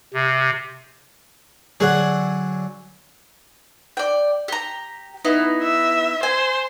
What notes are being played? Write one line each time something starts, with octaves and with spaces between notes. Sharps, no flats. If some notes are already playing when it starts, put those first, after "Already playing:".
C3
D3 F#3 G#4 F#5
D5 G5
G4 A#5
B3 D#4 E4
E5
C5 G#5